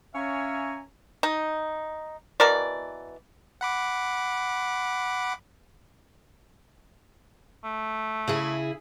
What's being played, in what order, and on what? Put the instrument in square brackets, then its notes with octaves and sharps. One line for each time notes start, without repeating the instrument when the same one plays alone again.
[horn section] C#4 C#5 E5 F5 G#5 A#5
[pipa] D#4
B2 E3 A#4 D5
[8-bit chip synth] F#5 B5 D6
[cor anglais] A3
[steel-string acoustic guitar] C#3 E4 G#4